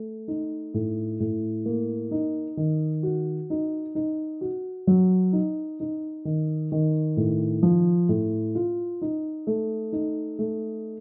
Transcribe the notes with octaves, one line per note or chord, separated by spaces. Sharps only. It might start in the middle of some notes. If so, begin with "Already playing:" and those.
Already playing: A3
D#4
A2
A2
A#3
D#4
D#3
F#4
D#4
D#4
F#4
F#3
D#4
D#4
D#3
D#3
A2
F3
A2
F4
D#4
A3
D#4
A3